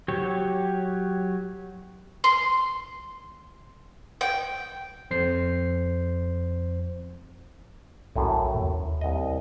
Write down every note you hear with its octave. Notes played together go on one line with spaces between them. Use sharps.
F#3 G4 C#5
C6
G5
F2 C5 C7
A#1 F#2 A2
D#2
C2 D#5